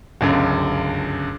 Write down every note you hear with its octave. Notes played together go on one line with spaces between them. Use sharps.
G1 C#2 F#2